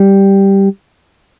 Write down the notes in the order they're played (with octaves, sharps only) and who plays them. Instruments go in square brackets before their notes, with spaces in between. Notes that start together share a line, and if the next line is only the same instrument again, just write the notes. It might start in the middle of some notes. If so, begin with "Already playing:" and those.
Already playing: [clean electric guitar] G3